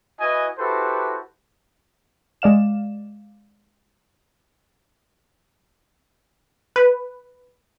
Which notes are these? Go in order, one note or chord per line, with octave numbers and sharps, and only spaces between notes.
E4 F#4 B4 D#5 G#5
E4 F#4 G4 A4 B4 C5
G#3 D5 F5 E7
B4